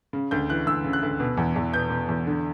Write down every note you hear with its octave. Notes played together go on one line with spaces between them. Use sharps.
C#3
D2 G6
E3 F#6
D2 E6
C#3
F#6
D2
B2
E2
E2
B2 G6
B2
E2
D3